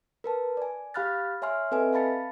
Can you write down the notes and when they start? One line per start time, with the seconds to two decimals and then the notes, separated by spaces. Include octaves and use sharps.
0.24 A#4 B4 A5
0.57 D5 G#5
0.94 G4 F5 B5 F6 F#6 A6
1.42 C#5 E5 G#5 C6 F6
1.71 C4 A4 B4 D#5 E5 G#5
1.93 F5 A5 B5 A6 C#7